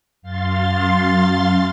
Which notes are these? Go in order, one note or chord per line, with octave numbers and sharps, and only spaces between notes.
F#2 F5 C6 A6